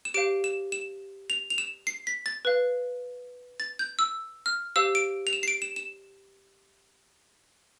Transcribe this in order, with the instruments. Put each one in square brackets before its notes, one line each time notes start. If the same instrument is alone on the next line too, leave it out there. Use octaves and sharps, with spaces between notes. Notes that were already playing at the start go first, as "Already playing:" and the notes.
[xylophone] E7
G4 C5 F5 D7
E7
E7
F7
F7
E7
C7
B6
A6
B4 F5
A6
G6
E6
F6
G4 C5 F5 E6
D7
F7
E7
C7
D7
E7
E7